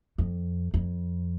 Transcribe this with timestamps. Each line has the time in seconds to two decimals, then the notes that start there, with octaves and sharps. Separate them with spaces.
0.18 F2
0.74 F2